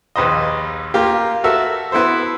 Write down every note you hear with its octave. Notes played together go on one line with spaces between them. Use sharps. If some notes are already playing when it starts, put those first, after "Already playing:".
A#1 D#2 B4 C5 D#5
A#3 F4 G4
F#4 A4 A#4 E5
B3 E4 A4 C5